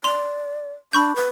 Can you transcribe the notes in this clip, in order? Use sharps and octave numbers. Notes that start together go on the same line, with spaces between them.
D5 C6 F7
D4 B5 C#6 G6
B4